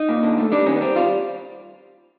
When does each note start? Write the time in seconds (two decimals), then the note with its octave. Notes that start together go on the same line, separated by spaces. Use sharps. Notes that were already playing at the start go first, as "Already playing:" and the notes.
Already playing: D#4
0.09 A#2
0.23 D3
0.38 A3
0.52 G3 D4
0.66 D#3 C#4
0.76 B3
0.81 G3 C4
0.96 G3 F4